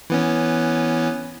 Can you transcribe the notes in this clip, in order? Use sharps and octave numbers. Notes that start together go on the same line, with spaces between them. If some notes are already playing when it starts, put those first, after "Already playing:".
E3 B3 C#4